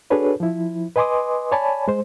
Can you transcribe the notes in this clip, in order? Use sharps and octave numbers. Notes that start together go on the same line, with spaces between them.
D4 F#4 G#4 A4 B4 C#5
F3 E4
B4 D#5 G#5 C6 D6 D#6
C#5 D5 G#5 A5 B5
G#3 C5